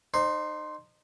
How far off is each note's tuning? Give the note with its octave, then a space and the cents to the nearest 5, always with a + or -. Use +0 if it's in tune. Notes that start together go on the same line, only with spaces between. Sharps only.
D#4 -30 C5 +5